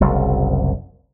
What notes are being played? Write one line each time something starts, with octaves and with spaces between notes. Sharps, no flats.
F#1 C2 F#2